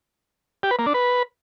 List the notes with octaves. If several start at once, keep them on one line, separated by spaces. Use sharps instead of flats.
G4
B4
A#3
D4
B4